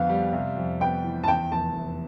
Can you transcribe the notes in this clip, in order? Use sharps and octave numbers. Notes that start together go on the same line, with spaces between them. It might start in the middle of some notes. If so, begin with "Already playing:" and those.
Already playing: F2 D3 B3 F5
G3
C3
F2
B3 G5
E3
A5
E2 G5
F1 A5
F1